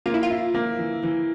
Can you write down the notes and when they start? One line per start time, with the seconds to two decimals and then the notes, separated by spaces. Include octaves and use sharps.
0.06 A#3 F4
0.14 E4
0.23 F4
0.30 E4
0.54 A#3
0.79 E3
1.03 E3